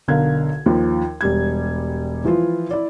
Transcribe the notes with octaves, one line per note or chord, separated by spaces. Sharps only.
B1 D3 A#4 F5 G#6
D#2 F3
E1 G3 G#6
E3 F3 E4 F4
E4 D5